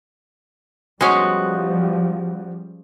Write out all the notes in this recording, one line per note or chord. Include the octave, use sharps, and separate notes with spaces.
F3 G3 G#3 B3 C#4 F#4 C5